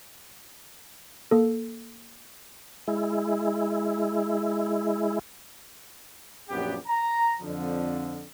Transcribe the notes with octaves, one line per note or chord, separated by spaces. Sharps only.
A#3 A4
G#3 E4
A#1 F#2 A#2 B3 F#4 G4
A#5
F2 D3 F3